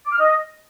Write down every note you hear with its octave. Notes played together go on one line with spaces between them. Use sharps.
D6
F6
D#5